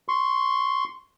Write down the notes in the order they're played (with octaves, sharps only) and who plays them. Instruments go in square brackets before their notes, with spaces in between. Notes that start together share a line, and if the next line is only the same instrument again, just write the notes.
[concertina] C6 C#6